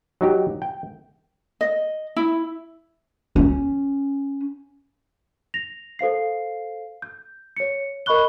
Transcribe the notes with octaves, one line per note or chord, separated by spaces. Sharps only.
F#3 D#4 G4
G5
D#5
E4
C#4
A#6 F7
A4 C5 F5 C7
G6
C#5 C#7
A#4 D#5 B5 C#6 F#6 G7